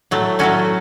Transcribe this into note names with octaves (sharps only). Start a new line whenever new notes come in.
A2 F#3 A3
A2 F#3 A3 C#4 F#4